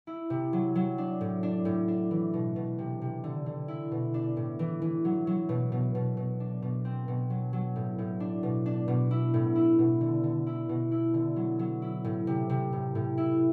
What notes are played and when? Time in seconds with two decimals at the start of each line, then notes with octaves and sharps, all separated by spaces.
0.07 E4
0.30 C3
0.53 F#3
0.75 F#3
0.98 D4
1.21 A2
1.43 D4
1.65 A2
1.88 D4
2.11 E3
2.33 B2
2.56 B2
2.78 C3
3.02 C3
3.24 D3
3.46 D3
3.68 E4
3.92 B2
4.14 D4
4.37 A2
4.59 E3
4.82 E3
5.05 F#3
5.27 F#3
5.49 B2
5.72 B2
5.95 B2
6.17 B2
6.40 D4
6.62 B2
6.85 C4
7.08 B2
7.30 F#3
7.53 F#3
7.76 A2
7.98 A2
8.20 D4
8.43 B2
8.66 D4
8.88 B2
9.11 E4
9.34 A2
9.56 E4
9.79 B2
10.01 D3
10.24 D3
10.47 E4
10.69 B2
10.92 E4
11.14 D3
11.36 F#3
11.59 F#3
11.82 E4
12.04 A2
12.27 C3
12.50 C3
12.73 A2
12.95 A2
13.18 E4